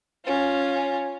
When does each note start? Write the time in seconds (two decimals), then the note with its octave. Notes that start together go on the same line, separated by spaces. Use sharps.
0.24 C#4 F4